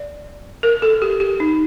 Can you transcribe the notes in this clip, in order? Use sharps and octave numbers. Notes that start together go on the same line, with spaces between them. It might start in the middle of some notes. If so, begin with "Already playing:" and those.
Already playing: D5
A#4
A4
G4
G4
D#4